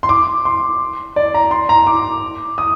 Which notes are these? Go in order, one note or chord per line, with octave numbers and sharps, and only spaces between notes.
C6
D6
C6
D5
A#5
C6
A#5
D6
D#6